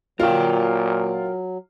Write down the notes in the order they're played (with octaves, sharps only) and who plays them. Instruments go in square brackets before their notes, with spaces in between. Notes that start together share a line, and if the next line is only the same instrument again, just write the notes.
[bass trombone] A#2 [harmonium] F#3 [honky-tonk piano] F4 [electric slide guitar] A#4 G5